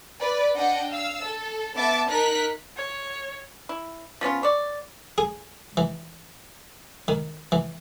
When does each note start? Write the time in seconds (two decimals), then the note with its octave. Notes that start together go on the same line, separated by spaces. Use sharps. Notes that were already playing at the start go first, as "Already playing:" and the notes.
0.19 B4 D5
0.56 D4 D#5 F#5 G5
0.90 F5 E6
1.23 A4
1.77 B3 E5 A5 D6 A6
2.09 D#4 A#4 F#6 B6
2.77 C#5
3.69 E4
4.21 F3 B3 C#4 F4
4.43 C#5 D5
5.18 G#4
5.77 E3
7.08 D#3
7.52 E3